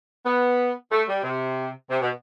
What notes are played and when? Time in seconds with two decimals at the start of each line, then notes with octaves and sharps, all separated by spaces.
0.24 B3
0.91 A3
1.08 G3
1.23 C3
1.90 C3
2.02 B2